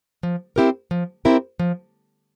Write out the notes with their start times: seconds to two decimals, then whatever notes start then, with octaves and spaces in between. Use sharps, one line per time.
0.23 F3
0.56 C4 E4 G4 A#4
0.91 F3
1.25 C4 E4 G4 A#4
1.59 F3